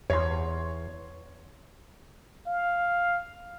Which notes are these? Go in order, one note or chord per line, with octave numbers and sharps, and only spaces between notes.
E2 C#5 C6
F5